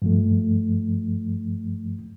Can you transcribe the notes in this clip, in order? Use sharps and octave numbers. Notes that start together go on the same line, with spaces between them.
G2 F3 A3